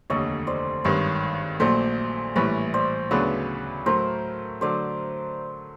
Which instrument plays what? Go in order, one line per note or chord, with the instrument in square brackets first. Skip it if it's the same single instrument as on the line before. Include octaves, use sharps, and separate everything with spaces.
[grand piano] F1 D#2 D3 [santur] C#5 D#5
[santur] C5 D5
[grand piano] G#1 G2 D#3 [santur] B4 C#5
[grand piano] A#1 A#2 F#3 A3 [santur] C5 D5
[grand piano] A#1 A2 E3 G3 [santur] B4 C#5
[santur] C5 D5
[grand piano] D2 C#3 F#3 B3 D4 [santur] B4 C#5
[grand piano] A2 F#3 A3 [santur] A#4 C5
[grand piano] D3 F#3 A3 [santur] C5 D5